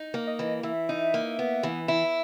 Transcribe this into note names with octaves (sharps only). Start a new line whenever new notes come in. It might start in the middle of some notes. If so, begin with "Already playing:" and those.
Already playing: D#4
A#3
D#5
E3
E3 E5
D#4
A#3
B3
E3
E4